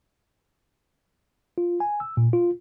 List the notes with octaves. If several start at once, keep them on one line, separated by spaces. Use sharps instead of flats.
F4
G#5
E6
A#2
F4